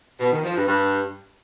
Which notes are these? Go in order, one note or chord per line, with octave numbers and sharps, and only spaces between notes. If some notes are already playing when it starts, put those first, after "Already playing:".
B2
D#3
F3
G2
G2